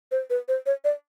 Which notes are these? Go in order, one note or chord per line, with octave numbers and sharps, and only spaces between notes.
C5
B4
C5
C#5
D5